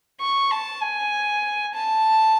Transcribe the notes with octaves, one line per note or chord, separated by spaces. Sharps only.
C#6
A5
G#5
A5